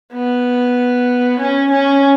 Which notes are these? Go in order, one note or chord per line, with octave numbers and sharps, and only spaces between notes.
B3
C#4
C#4